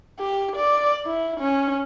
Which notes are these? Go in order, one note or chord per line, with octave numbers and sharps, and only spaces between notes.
G4
D5
E4
C#4